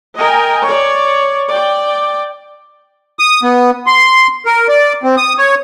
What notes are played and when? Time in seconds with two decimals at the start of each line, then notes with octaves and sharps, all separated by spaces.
0.18 A#4 D#5 G5 G#5
0.67 C#5 D5
1.49 D5 G5
3.19 D#6
3.43 B3
3.87 C6
4.46 A#4
4.68 D5
5.03 C4
5.17 D#6
5.38 C#5